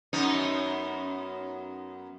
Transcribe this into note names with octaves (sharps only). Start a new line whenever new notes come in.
F#2 B3 D#4